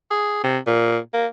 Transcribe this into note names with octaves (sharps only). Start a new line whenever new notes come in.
G#4
C3
A#2
A#3